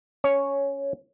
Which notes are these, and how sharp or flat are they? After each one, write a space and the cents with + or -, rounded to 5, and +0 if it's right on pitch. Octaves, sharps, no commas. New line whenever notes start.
C#4 +10 C#5 +0